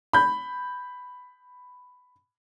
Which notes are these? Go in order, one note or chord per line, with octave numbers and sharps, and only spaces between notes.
B5 G6